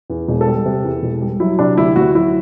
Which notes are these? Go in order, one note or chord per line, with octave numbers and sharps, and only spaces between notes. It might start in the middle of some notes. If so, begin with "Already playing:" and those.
E2
E1
A4
G3
C3
E2
E1
G3
F#3 E4
C3 D4
D2 E4
D2 F#4
F#3 E4